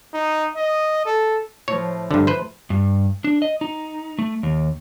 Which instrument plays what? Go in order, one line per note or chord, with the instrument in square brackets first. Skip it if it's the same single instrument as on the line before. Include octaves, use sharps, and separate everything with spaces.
[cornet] D#4
D#5
A4
[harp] A2 F3 [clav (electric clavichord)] C#5
[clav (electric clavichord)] G2 D3 [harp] F4
[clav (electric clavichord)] B4 C5
[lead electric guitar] G2
D4
D#5
D#4
A3
D#2